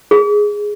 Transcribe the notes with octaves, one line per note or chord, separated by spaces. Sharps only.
G#4